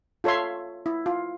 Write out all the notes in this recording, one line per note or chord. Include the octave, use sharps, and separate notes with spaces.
F4 A4 C#5 E5 C6
E4
F4